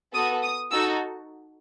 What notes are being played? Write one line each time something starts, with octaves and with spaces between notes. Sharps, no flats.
B3 F#4 A4 D#6
D#6
D#4 F#4 A4 E6